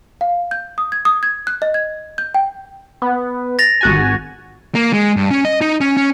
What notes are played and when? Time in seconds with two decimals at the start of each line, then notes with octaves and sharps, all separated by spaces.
0.21 F5
0.51 G6
0.78 D#6
0.92 G#6
1.05 D#6
1.23 G#6
1.47 F#6
1.62 D#5
1.74 G#6
2.18 G6
2.35 G5
3.02 B3
3.59 A6 A#6 F7
3.81 G#1 F#4 G#5
4.75 A#3
4.93 G#3
5.17 G2
5.31 C#4
5.45 D#5
5.61 D#4
5.81 C#4
5.97 C#4